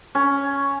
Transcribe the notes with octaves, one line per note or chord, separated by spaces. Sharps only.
C#4